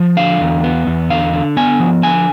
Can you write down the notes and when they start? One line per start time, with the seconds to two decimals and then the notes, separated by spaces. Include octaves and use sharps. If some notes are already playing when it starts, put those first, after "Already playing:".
Already playing: F3
0.17 D3 F5
0.41 E2
0.64 B3
0.87 E2
1.10 D3 F5
1.33 D3
1.57 B3 G#5
1.80 F3
2.03 D3 G#5